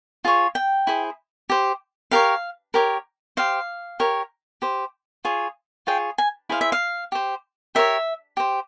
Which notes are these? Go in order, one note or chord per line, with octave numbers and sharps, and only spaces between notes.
F4 G#4 C#5
G5
E4 G#4 C5
G4 C5
G4 A#4 C#5 F5
G4 A#4 C#5
G4 C5 F5
G4 A#4 C#5
G4 C5
F4 G#4 C#5
F4 G#4 C#5 G5
G#5
E4 G#4 C5 F5
E5
F5
G4 C5
G4 A#4 C#5 E5
G4 C5